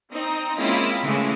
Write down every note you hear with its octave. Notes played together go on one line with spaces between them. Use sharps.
C4 D#4 D#5
G#3 A#3 C4 C#4 E4 F4
C#3 E3 G#3 A3